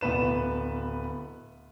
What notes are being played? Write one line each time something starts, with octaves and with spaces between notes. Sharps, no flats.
D1 B3 B4 E7